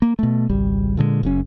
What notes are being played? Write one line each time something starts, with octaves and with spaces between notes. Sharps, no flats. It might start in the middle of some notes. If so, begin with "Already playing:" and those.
A#3
B2 A3
G#1 C#2 G3
A#2 D3 F#3 G#3
F#1 F#2 C#4